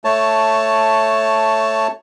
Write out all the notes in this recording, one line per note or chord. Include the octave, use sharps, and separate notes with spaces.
A3 C#5 A5